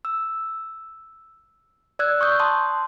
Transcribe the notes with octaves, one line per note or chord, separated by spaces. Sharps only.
E6
D5 E6 F#6 G#6
C#6 D#6 G6
A5 C6 D#6